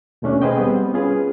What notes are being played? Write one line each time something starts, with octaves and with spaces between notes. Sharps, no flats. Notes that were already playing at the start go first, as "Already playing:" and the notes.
D#2 B2 A3 C#4 D4
G#4 B4 C5 D#5 G5
G3 B3 C4
C#4 F4 G#4 B4